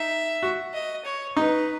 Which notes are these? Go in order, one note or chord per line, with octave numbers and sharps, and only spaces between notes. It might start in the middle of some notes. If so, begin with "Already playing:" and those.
Already playing: D#4 E5
F#4
D#5
C#5
D#4 B4